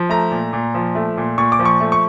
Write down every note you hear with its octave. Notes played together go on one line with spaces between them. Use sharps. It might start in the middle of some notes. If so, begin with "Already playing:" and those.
Already playing: F3
A3 A#5
A#2
A#2
F3
A3
A#2
A#2 C#6
D6
F3
C#6
A3
C#6